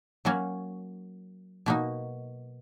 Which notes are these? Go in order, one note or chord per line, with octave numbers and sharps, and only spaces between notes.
F#3 A#3 C#4 F#4
B2 A#3 D#4 F#4